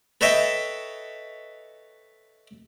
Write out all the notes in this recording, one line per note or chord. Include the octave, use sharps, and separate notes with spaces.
A4 B4 C#5 D#5 E5 G5